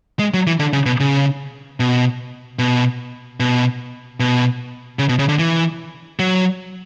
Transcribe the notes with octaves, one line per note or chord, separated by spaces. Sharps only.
G#3
F#3
E3
D3
C#3
B2
C#3
B2
B2
B2
B2
C#3
B2
C#3
D3
E3
F#3